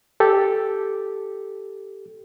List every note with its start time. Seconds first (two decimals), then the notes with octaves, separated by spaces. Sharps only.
0.20 G4 A4